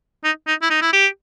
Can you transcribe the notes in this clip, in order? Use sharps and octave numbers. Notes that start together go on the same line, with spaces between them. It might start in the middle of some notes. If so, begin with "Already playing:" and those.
D#4
D#4
E4
D#4
E4
G4